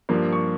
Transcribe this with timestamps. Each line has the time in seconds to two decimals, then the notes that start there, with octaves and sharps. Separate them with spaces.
0.09 G2 F3 A#3
0.33 C#6